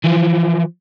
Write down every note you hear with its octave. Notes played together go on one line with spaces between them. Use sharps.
E3 F3